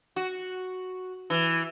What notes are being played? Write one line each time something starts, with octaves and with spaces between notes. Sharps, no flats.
F#4
E3